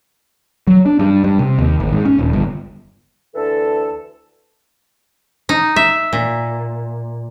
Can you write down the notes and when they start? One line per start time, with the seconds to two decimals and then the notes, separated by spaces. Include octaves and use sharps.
0.67 F#3
0.86 D4
0.99 G2
1.24 G2
1.39 C3
1.59 D#2
1.80 G#1
1.92 G#2
2.05 C#4
2.19 D#1
2.33 G1
3.35 D2 D3 E3 A4
5.49 D#4
5.76 E5
6.13 A#2